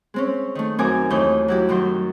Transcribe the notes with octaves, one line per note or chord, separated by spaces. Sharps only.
G#3 C4 C#4
D#3 A3
F#2 C4 D#4 A#4 G#5 D6
D#2 E3 A3 D#5 G6
F#3 E4 G4
F#2 D#3 F#3 C6 G6